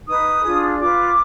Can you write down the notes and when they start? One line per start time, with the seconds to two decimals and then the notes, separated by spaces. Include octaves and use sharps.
0.07 D#4 B4 D#6
0.43 D4 F4 G#4
0.79 F4 B4 D6